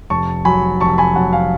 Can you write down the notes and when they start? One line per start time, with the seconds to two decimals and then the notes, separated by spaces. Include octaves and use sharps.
0.10 F1 A5 C#6
0.45 F#3 G#5 B5
0.80 F1 A5 C#6
0.98 G#5 B5
1.15 F#3 F#5 A5
1.33 F5 G#5